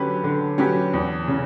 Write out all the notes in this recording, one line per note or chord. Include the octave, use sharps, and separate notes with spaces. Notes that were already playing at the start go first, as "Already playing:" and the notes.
Already playing: D3 F#3 C#4 G4 B4
D3
F#3 C#4 G4 B4
E2
C#3